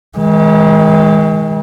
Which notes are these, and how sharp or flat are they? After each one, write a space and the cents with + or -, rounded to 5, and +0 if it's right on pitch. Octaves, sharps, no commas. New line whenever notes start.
D#3 +45 G#3 +0